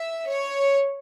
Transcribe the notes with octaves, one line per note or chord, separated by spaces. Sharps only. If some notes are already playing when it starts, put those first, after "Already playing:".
Already playing: E5
C#5